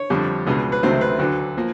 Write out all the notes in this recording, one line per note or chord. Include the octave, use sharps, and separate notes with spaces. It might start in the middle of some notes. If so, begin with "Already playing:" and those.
Already playing: C#5
F2 D3 G3
C#2 B2 G#3
B4
C#2 C3 D#3 F#3 A3 C5
B4
D2 D3 F#3
F3 A#3